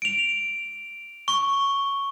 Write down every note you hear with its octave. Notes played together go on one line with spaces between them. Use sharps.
D7 F7
C#6